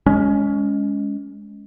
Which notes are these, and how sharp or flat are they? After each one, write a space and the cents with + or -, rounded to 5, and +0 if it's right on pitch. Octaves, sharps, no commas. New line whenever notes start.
G#3 +0 C#4 +25